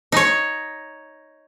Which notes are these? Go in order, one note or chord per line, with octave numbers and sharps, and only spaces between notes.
D#4 C#5